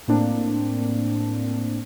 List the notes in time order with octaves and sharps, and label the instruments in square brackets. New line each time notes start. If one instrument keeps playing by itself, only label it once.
[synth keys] A2 A#3 C4 D4